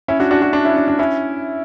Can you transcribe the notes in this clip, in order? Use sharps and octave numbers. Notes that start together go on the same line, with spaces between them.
C#4 E4
D4 F#4
D4 F#4
D4 F#4
D4 F#4
C#4 E4
D4
D4
C#4 E4